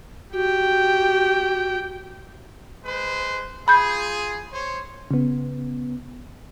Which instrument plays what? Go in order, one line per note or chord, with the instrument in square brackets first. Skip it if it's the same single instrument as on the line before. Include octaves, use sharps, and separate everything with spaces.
[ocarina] F#4 [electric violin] G4 G5
[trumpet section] G#3 B4 C5
[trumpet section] F4 G#4 [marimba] B5 G6
[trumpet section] C5 C#5
[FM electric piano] C#3 B3